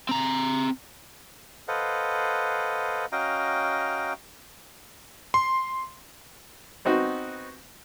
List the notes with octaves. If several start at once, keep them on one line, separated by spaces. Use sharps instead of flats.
C4 A#5
A4 B4 C5 D#5 F5 F#5
C#4 F#4 D#5 F5 G5 A#5
C6
B3 C4 D#4 F#4